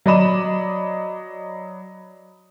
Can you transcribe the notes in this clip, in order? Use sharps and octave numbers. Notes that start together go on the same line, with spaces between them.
F#3 D5 D#5 B5 E7